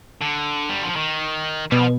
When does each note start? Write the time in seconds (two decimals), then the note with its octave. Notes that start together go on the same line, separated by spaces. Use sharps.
0.21 D3
0.69 G3
0.83 F3
0.96 D#3
1.71 B2 G3
1.79 F3